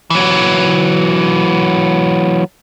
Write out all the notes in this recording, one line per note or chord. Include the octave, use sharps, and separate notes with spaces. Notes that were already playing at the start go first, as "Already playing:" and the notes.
E3 F#3